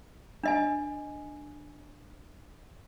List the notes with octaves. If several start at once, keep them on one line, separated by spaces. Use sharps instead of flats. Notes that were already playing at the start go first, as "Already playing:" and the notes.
D4 D#5 G#5